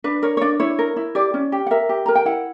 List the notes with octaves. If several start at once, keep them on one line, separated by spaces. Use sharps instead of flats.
D4 B4
A#4 C#5
C#5
D4 D5
E4 C#5
A#4
E4
G4 D5
C#4
G4
F#5
A#4 E5
G4
A#4 A#5
G5
E4 F#5